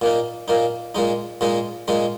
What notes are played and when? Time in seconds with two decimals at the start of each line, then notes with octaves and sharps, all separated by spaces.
0.01 A#2 A#3 D#4
0.48 A#2 A#3 D#4
0.95 A#2 G#3 D#4
1.41 A#2 G#3 D#4
1.88 A#2 G#3 D#4